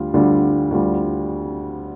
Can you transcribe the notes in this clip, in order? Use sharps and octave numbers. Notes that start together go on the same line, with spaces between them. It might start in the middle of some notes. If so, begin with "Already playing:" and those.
Already playing: D2 D3 G3 F4
D2 D3 G3 F4
D2 D3 G3 F4